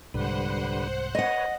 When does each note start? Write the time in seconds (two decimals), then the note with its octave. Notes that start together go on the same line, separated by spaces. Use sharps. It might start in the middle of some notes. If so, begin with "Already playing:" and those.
0.14 C2 G#2 D3 G3 B4 C5 F#5
1.15 B4 C#5 D#5 F#5